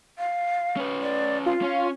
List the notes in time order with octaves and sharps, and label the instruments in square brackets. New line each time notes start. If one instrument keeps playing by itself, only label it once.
[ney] F5
[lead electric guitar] C#4 B4
[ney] D5
[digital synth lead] F4 [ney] F5
[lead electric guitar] C#4